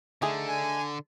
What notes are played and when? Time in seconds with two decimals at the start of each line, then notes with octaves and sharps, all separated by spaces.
0.22 D3 A3 D#4 G#4
0.46 G#5